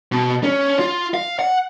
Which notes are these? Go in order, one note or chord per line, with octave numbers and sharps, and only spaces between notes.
B2
C#4
F4
F5
F#5